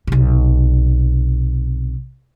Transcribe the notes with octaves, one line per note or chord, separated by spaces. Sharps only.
B1 C3